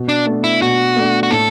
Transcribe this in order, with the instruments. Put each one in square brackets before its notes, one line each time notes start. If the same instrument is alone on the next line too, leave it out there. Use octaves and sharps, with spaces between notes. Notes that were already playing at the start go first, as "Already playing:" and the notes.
Already playing: [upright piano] B2
[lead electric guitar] D4
[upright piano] A3 D4
[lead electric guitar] E4
[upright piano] B2 [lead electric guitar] F#4
[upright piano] A3 D4
[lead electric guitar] F#4
[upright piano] A2 [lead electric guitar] A4